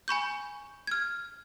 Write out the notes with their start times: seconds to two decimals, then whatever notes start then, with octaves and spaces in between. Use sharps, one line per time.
0.08 G#5 B5 C#6 G6
0.87 F6 G#6